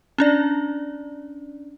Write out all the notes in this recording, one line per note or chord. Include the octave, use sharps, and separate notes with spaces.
C#4 D4 D5